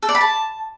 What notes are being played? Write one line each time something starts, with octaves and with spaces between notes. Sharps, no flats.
A4
D5
B5
A5